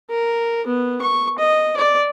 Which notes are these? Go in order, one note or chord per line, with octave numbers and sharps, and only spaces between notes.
A#4
B3
C#6
D#5
D5